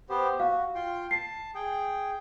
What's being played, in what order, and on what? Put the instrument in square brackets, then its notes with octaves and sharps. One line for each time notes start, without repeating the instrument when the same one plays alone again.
[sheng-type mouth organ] B3 G4 C5
[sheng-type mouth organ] F#4 [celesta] F5
[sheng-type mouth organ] F4 G5 C6
[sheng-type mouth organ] A5 [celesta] C7
[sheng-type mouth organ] G#4 G5